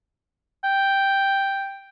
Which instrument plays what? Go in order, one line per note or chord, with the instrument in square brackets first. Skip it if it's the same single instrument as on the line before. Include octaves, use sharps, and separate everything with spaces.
[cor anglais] G5